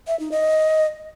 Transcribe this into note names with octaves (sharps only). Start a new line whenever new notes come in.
E5
D#4
D#5